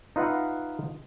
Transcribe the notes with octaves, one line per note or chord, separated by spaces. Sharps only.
D#4 F4 B4 E5 F#5